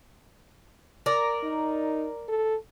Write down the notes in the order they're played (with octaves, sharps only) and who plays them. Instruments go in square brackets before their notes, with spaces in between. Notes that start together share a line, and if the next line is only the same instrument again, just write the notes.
[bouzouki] A#4 D5
[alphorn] D#4
A4